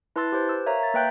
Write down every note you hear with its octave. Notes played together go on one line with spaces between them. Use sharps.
E4 B4 A5 C6 E6 A6
G4 B4 C5
E6
A#4 C#5 E5 F5 A#5
A#5 A6
A#3 B4 E5 G5 F#6 G6